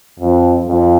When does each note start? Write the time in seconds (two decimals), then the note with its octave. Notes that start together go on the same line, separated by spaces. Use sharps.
0.19 F2
0.66 F2